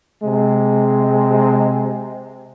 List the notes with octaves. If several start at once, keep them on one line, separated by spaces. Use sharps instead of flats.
C3 G#3